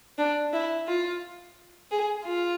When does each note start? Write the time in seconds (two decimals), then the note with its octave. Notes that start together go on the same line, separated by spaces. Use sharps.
0.18 D4
0.53 E4
0.87 F4
1.91 G#4
2.25 F4